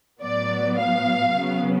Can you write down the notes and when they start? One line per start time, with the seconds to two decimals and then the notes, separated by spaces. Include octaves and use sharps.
0.22 A2 F#3 B3 D5
0.79 F5
1.37 C#3 F#3 B3